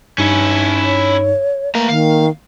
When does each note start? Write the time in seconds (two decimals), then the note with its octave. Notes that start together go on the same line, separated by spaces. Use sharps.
0.18 G2 C#4 D#4 E4 C#7
0.82 C#5
1.75 A3 A#3 A#5
1.89 D#3 F5